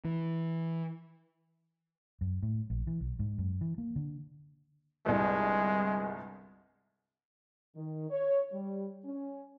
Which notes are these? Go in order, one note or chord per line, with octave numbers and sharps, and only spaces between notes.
E3
F#2
A2
A#1
E3
B1
G#2
F#2
E3
A#3
D3
G1 C2 G#3
D#3
C#5
G3
C#4